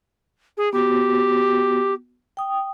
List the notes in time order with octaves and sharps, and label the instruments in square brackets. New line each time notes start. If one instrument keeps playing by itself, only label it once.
[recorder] G#4
[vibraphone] B3 F#4 [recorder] G4
[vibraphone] G5 D#6